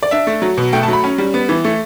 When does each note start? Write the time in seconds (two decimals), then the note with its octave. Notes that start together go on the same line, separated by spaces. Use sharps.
0.03 D5
0.11 D4 E5
0.27 A3
0.42 F#3
0.57 B2
0.73 A3 G5
0.83 A5
0.88 F#3 B5
1.04 C#4
1.18 G3
1.34 B3
1.49 E3
1.64 A3